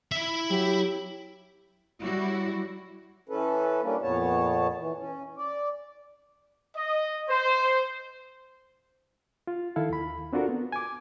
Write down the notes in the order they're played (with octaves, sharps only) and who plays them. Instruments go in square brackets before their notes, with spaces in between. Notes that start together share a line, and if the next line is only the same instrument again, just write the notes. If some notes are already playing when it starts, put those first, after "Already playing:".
[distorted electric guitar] E4 E5
[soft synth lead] F#3 [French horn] G4
[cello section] F#3 G3 E4 F#4
[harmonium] E3 C#4 A4 B4
G3 A#3 C#4 D4
F2 A#2 B3 C#5 A5
E3
C#4
D5
[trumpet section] D#5
C5
[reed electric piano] F4
D#3 E4 A4 F5
D#2 B5
C4 D4 F4 F#4 A4 A#4
B3
G#5 D6